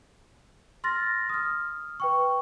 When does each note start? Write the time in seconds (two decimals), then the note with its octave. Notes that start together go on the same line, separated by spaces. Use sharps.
0.84 C6 F6 A6 A#6
1.29 D#6 F6
2.00 B4 G5 C#6